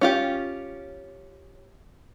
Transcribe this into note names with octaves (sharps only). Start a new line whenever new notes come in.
C#4 F4 G4